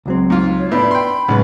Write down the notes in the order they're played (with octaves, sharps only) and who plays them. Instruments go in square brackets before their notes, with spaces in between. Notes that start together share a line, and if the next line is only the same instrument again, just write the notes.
[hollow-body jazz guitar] C#2 F#3 C4
[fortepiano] G#2 F4
[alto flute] C#5
[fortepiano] A2 [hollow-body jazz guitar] B3 D4 [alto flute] B5
[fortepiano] G5 C6
[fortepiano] B1 B4 [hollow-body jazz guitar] A2 C#3 G#3